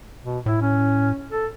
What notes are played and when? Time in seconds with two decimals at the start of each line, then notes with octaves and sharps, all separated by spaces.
0.25 B2
0.46 A2 E4
0.61 C#4
1.30 A4